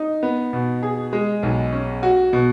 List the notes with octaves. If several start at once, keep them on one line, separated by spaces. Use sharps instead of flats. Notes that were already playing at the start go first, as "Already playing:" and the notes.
Already playing: D#4
B3
B2
G#4
G#3
B1
C#4
F#4
B2